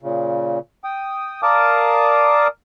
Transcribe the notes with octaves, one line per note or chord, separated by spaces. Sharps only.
A#2 C#3
G5 D#6
A#4 D5 F5 A5 D6 D#6